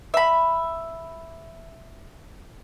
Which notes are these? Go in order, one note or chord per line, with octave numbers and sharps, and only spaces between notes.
E5 B5